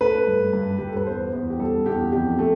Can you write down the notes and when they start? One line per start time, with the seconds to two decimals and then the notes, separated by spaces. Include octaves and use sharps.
0.01 A3 B4
0.27 G2
0.53 G2
0.79 G2 G4
0.87 A4
0.96 B4
1.07 E2 C5
1.33 E2
1.50 G4
1.59 G3 A4
1.86 E2 G4
2.13 F2 G4
2.39 A3